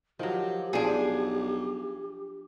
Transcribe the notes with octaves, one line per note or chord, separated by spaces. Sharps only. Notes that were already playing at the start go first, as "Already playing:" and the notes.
D#3 F3 F#3 G4
B1 F3 D4 G#4 C5 G#5